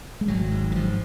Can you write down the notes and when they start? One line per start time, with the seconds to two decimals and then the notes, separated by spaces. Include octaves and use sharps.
0.21 G#3
0.28 G#1 F#3
0.52 G#2
0.72 D#3
0.75 G#2 F3